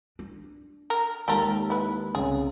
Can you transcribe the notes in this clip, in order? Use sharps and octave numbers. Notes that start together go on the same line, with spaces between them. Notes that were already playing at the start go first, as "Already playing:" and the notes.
D4
A#4
D#2 G#3 F4 G4 A4 A#4
E4 B4
C2 C#3 G#4